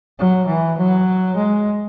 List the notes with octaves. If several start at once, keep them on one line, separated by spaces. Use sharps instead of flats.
F#3
E3
F#3
G#3